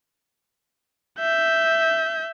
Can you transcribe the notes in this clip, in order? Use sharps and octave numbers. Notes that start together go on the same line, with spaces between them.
E5 G6